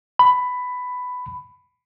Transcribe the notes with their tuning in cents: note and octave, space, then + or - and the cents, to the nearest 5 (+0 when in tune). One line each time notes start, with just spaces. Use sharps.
B5 +10